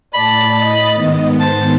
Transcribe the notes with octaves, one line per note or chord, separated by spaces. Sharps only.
A2 D5 A5 B5 A6
D#5
G#2 D#3 B3
C5 A5